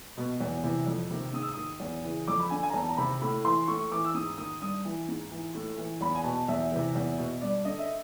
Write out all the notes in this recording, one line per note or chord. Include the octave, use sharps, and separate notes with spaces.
B2
E2
C3 E3
F2
C3 D#3
G#2 D#6
E6
D#3 D#6
E2
C#3 E3
F2 D6
B5
D3 G#5
G#5
A#5
E2 A5
A#5
C3 D#3 B5
A2 B5
E3 C6
A2 C#6
E3 D6
E6
G#2 D#6
D#3 D#6
G2 D#6
E3
G#2
E3
A2
E3
E2 B5
G#5
B2 A5
E2 E5
C3 E3
E2
B2
G2 D5
D3 D#5
E5